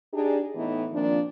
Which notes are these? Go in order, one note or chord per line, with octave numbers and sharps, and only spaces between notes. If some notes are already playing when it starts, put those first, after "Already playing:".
D4 D#4 G4 G#4
A2 E3 B3 D#4
A#2 D#3 F3 A#3 C4 D4